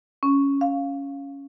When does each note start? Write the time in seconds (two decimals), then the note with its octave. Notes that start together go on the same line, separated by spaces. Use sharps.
0.23 C#4
0.61 F5